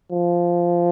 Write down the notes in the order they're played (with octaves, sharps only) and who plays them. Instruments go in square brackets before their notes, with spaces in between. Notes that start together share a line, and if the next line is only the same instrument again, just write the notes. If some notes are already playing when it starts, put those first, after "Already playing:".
[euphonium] F3